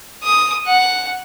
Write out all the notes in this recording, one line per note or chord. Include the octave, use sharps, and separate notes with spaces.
D#6
F#5